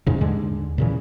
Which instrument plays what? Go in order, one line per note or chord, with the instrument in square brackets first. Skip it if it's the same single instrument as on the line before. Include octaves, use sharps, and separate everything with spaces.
[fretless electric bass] E2 G#2 C#3
D#2 D3 G#3
A#2 C#3 E3